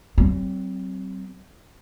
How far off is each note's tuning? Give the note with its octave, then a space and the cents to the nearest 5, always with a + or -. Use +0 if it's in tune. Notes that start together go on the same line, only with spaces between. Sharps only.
F#3 +40 C4 +0